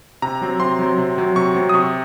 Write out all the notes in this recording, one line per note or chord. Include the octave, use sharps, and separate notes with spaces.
C3 A#5
F#3 C4
C3 C6
F#3 C4
C3
F#3 C4
C3 C#6
F#3 C4
D#6
C3 C#6